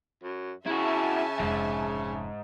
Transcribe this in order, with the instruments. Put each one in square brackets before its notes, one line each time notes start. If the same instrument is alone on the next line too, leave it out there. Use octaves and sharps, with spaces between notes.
[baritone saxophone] F#2
[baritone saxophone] C#3 [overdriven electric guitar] E4 F#4 [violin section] E5 G#5 A5
[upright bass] F1 [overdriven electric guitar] G#2